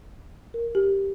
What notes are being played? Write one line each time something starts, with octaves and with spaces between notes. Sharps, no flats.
A#4
G4